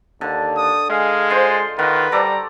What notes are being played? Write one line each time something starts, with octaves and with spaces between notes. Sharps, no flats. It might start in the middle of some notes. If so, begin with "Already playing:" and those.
D#2 D3
D#6
G#3 F5 G#5
F4 C5 C6
D#3 F4 F#4 B4
G3 A4 D5 A#5